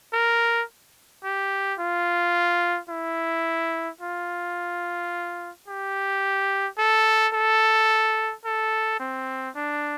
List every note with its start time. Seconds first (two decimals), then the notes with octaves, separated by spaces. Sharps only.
0.13 A#4
1.24 G4
1.79 F4
2.89 E4
4.01 F4
5.68 G4
6.78 A4
7.34 A4
8.45 A4
9.00 C4
9.56 D4